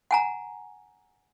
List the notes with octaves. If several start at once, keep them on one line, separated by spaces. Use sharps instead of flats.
F#5 G#5 A#5